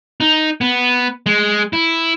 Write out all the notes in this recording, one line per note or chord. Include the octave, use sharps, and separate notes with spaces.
D#4
B3
G#3
E4